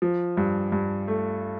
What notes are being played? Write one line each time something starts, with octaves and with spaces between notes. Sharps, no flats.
F3
G2
G2
A3